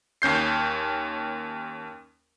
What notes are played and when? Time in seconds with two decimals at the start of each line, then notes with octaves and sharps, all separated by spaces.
0.22 D#2 C#4 G6 C7